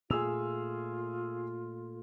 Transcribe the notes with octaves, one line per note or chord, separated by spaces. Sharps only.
A#2 A3 F4 G#4 E6 F7